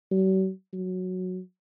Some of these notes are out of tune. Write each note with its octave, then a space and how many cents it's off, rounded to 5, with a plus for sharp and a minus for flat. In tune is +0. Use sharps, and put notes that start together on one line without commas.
F#3 +45
F#3 -10